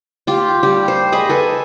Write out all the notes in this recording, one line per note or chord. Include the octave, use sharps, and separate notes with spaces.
F4 G4
G3 G4
C5
G#4 D#5 B5
A4 B4 G#5